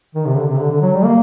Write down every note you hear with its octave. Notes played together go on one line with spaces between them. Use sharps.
D#3
C3
D3
C3
D3
D3
F#3
G3
A#3